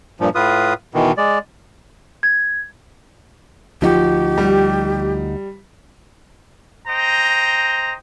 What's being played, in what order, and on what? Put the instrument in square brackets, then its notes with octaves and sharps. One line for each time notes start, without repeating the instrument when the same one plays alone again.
[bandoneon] G2 A#2 F3
A2 F4 B4 D#6
B2 D#3 E3
G#3 D5
[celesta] G#6
[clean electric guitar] D2 D#4 F#4 [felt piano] F3 [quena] G4
[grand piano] G3
[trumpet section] C5 D#5 G5 A#5